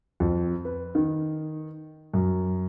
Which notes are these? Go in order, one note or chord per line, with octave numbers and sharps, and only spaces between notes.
F2
B4
D#3
F#2